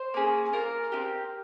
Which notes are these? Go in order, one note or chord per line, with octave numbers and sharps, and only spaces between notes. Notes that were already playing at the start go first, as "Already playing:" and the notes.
Already playing: C5
A#3 C#4 G#4
A#3 C#4 F4 A#4 A#5
C4 D#4 G4